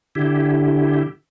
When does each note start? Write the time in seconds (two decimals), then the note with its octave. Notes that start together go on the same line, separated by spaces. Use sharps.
0.15 D3 E4 G4